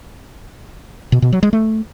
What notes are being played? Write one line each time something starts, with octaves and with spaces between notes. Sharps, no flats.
B2
B2
F#3
G#3
A3